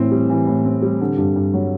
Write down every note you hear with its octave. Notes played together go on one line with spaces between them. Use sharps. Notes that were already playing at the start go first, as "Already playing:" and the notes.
Already playing: A2 E3 C4
G3
E3
A2
C4
G3
D3
G2
G2
F#3